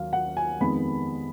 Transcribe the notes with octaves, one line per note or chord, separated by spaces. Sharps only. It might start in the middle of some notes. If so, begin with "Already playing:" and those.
Already playing: D#2 F#3 F5
F#5
G#5
F2 D#3 G#3 B3 B5